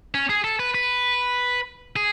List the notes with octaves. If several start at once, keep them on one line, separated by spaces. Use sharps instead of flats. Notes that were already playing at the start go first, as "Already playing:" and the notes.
C#4
G#4
A4
B4
B4
G#4